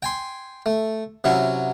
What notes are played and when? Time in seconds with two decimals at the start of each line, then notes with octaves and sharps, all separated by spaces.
0.03 G5 G#5 C6
0.66 A3
1.24 C3 F#3 C#4 E4